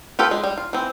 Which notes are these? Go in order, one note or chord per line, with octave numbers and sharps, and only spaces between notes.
F4 G4 A4 B4
G#3
G3
F4
E3 C4